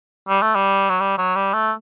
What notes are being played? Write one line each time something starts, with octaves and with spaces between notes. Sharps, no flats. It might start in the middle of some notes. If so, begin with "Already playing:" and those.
G3
A3
G3
F#3
G3
F#3
G3
A3